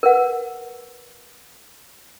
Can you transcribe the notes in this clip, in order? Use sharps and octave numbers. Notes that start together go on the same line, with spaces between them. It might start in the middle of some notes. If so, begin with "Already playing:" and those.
A#4 B4 F#5